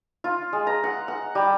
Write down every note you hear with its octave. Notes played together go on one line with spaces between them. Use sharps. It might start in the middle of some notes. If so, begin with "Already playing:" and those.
F4
G#3
A#5
F#5
F#5
G3